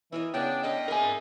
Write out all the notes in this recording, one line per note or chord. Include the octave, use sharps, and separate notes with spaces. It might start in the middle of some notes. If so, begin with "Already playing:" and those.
E3 E4 A#4 D#5
C#3 B3 D4 D#5 G5
A2 E3 D4 A4 D#5 F5
G#4 A#4 E5 G#5